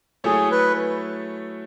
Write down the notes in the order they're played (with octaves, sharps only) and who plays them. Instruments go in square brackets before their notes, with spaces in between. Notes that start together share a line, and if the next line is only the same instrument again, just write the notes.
[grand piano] F#3 A3 E4 A4 C#5 [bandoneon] G#4
[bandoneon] B4